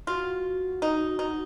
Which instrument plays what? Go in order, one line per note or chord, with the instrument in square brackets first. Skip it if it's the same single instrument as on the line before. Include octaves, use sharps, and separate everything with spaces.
[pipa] F4 [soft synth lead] F#4
[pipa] D#4
D#4